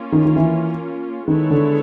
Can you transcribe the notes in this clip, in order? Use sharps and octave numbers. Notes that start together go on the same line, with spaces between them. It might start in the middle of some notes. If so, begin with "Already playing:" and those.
Already playing: A#3 C#4 F4
D#3
D#3
E3
D#3 G#3 B3 E4 A4 C#5
D3